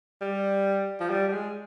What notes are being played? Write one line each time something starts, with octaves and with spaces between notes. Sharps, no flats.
G3
F3
G3
G3
G#3